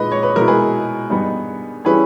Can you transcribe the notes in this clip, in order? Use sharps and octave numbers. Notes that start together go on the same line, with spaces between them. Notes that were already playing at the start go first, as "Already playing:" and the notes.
Already playing: A#2 G#3 D#4 B4 D#5
C#5
B4
B2 G#3 B3 E4 A#4
G#4 B4
G2 G3 B3 D#4
E3 G3 C#4 E4 G#4 B4